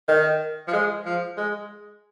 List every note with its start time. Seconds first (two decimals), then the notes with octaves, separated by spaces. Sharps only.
0.08 D#3
0.67 F3
0.73 G#3
1.05 F3
1.37 G#3